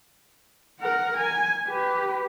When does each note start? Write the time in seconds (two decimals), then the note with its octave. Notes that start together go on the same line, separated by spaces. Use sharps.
0.80 A#4 F#5
1.17 G#5
1.68 G4 B4